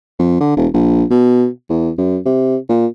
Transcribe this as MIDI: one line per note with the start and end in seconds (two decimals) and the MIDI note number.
0.19 0.38 41
0.40 0.53 50
0.56 0.67 28
0.74 1.04 34
1.10 1.47 47
1.70 1.90 40
1.98 2.19 42
2.25 2.57 48
2.69 2.86 46